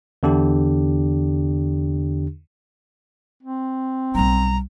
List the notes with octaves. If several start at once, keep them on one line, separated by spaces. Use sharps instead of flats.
E2 D3 D4 G4
C4
B1 G3 A#5